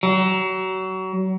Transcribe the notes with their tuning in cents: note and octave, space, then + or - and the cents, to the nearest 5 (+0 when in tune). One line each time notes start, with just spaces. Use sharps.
F#3 +30